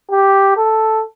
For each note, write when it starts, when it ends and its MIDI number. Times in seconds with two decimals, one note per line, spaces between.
0.11 0.54 67
0.57 1.03 69